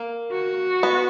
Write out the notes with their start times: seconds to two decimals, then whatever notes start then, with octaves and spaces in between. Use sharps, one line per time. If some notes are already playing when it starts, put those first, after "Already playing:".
Already playing: A#3
0.32 F#4
0.83 B3